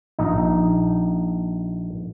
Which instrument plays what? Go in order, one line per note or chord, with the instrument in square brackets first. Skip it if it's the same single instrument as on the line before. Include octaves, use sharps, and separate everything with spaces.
[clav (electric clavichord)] A#1 D#4